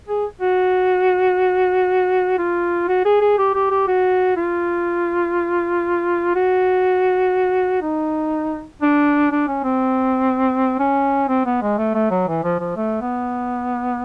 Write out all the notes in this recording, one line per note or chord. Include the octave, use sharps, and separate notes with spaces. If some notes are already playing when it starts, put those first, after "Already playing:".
G#4
F#4
F4
F#4
G#4
G#4
G4
G4
G4
F#4
F4
F#4
D#4
D4
D4
C#4
C4
C#4
C4
B3
G#3
A3
A3
F#3
E3
F3
F3
A3
B3